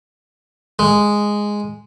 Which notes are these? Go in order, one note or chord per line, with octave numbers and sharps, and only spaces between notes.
G#3